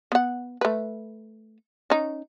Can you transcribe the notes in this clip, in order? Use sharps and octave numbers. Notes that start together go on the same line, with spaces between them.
B3 F#5
A3 B4
C#4 D#4